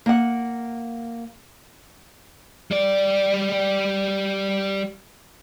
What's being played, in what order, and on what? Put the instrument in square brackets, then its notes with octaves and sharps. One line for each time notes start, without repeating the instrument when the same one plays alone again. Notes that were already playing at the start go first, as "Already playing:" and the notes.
[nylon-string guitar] A#3 F#5
[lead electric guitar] G3 D5